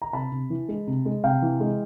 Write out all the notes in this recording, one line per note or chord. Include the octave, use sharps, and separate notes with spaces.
A#5
C3 A5 B5
C3
E3
G#3
C3
G#3
C3 F5 G5
E3
G#3